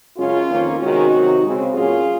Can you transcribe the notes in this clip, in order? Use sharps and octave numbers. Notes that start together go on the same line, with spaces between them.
F#2 C#3 G#3 C#4 F4
F2 D#3 A#3 C#4
C3 D#3 G#3 C#4 D#4 F#4
C3 D#3 F#3
C#3 G#3 C4
A#2 F#3 A#3 C#4 F4 G#4